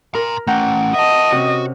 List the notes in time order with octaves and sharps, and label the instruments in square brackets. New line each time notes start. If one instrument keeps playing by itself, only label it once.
[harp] A#4 [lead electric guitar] A#5 C6
[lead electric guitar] A3 C#4 [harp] F#5 G5 A#5
[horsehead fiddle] D#5 [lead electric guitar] E5 A5
[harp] C3 C#4 [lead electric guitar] F#4